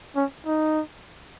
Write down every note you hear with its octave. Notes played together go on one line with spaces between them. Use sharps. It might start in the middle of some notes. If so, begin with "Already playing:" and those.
C#4
D#4